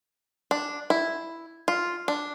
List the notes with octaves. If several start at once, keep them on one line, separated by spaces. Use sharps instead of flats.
D4
E4
F4
D4